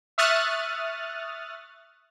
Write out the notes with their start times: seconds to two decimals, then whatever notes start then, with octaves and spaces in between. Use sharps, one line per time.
0.18 E5 C#6 D#6 F6 F#6 A6